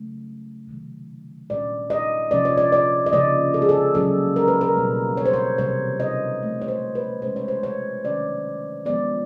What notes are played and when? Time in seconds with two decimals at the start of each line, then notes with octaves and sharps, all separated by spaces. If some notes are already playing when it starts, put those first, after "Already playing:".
Already playing: C#3 F#3 A3
0.67 C3 D#3 F#3 A3
1.50 A#2 G3 A#3 C#4 D5
1.90 D#5
2.31 C3 F3 A#3 C#4 D5
2.45 C#5
2.58 D5
2.72 D5
3.06 D#5
3.13 C#3 F3 A#3 C#4 D5
3.54 A4
3.62 G#4
3.69 A4
3.95 C#3 F#3 A#3 C#4 A4
4.36 A#4
4.48 B4
4.61 A#4
4.76 B2 G3 A#3 C#4
5.17 C#5
5.26 C5
5.33 C#5
5.58 C3 E3 G3 C4 C#5
6.00 D#5
6.41 C3 F3 A3 C4
6.62 C#5
6.68 C5
6.95 B4
7.22 C3 E3 G#3 C#4 C5
7.36 C#5
7.48 C5
7.63 C#5
8.04 C3 D#3 F#3 A#3 C#4 D5
8.85 F3 G#3 B3 D5